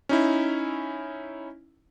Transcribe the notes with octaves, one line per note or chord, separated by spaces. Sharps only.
C#4 D#4 E4